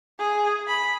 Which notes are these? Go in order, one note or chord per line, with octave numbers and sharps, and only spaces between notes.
G#4
B5